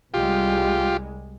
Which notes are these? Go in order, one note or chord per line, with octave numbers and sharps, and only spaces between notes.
C2 G3 G#3 F4 G4